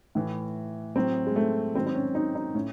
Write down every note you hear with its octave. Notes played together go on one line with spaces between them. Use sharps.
A2 E3
A2 F#3 C4
G#3
A3
G#2 D#3 F#3 C4
C4
C#4
D#4
D#4
A2 C#4